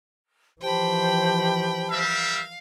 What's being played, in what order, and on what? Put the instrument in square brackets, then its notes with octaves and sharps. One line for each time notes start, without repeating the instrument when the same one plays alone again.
[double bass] E3 F3 [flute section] G4 C5 A5 [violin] G5 B5
[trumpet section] G3 A#4 E5 [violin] F5